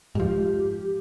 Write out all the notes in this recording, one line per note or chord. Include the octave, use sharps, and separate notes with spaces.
G#2 F3 G4